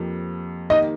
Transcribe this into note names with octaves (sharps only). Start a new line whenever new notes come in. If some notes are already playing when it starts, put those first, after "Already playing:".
Already playing: F2 F3 A#3 G4
D#3 A#3 D#4 G4 D#5